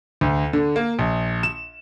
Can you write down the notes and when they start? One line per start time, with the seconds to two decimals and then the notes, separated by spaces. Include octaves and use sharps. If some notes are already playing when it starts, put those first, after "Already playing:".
0.21 D2
0.53 D3
0.76 A#3
0.99 A#1
1.43 E7